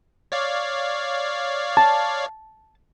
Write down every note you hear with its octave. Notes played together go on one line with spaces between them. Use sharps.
C#5 D5 F5
A5